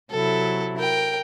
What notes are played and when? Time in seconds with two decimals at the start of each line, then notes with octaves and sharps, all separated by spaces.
0.11 C3 F#3 E4 A4
0.78 A#4 G5